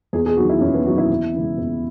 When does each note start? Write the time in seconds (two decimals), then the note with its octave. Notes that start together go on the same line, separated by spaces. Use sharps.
0.13 E2 G#4
0.26 G#4
0.37 D#3 F#3 F#4
0.49 E4
0.61 E2 C#4
0.74 B3
0.85 D#3 F#3 F#4
0.98 E4
1.10 E2
1.34 C#3 E3 G#3
1.58 E2